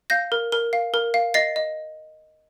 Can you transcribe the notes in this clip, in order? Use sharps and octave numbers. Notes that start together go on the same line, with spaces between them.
F5 G6 A#6
A#4
A#4
F5
A#4
F5
D#5 A6 C7
D#5